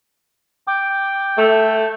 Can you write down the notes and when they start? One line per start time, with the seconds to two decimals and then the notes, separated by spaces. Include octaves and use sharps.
0.67 G5 D6
1.38 A3 A4